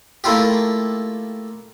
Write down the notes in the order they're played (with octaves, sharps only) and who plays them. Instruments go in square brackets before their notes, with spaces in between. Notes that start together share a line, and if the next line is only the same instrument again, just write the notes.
[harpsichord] A3 A#3 E4 F4 G4